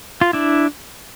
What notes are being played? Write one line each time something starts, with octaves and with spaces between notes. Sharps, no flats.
F4
D4 E4